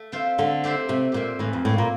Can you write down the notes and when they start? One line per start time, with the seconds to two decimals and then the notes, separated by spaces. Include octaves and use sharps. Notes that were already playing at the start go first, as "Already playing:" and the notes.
Already playing: A3
0.12 C4 F4 C5 E5
0.38 D3 A3
0.64 C4 G4 C5 E5
0.89 C3 A3
1.12 A#2 C4 G4 C5 E5
1.39 A2 E3
1.53 F2
1.65 A2 A#3 E4
1.78 A#2